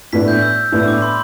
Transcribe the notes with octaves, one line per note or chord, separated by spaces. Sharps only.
A2 E3 B3 D4 B6
G6
E6
A2 E3 B3 D4
E6
D6
B5
C6